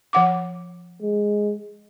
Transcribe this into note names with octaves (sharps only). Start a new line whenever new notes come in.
F3 F#5 D6
G#3